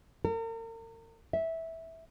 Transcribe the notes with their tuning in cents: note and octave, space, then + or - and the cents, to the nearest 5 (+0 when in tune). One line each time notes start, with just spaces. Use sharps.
A#4 -40
E5 -10